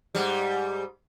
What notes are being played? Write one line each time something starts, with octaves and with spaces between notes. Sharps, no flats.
G#2 G3